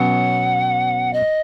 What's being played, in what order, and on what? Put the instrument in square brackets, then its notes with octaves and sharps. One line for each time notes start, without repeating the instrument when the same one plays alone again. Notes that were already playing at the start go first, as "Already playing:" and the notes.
Already playing: [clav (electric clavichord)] B2 F#3 C#4 [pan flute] F#5
[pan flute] D#5